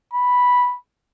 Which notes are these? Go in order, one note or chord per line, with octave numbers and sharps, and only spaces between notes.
B5